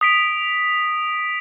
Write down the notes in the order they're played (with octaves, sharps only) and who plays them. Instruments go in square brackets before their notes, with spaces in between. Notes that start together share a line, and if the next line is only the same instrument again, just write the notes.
[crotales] D#6 B6 D7